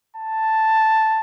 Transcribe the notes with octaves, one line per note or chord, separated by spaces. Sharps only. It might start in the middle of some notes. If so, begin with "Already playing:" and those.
A5